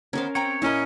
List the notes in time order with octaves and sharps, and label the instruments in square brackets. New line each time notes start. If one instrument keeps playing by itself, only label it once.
[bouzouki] D#3 B3 C5 [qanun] C#4 A#4 F5
[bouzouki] C4 G5 A#5 [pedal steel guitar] C#5
[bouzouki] A#2 A#4 [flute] C#4 [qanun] E4 D#5